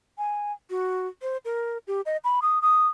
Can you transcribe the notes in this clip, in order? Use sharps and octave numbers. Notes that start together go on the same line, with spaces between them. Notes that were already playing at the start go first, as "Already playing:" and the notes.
G#5
F#4
C5
A#4
G4
D#5
B5
D#6
D#6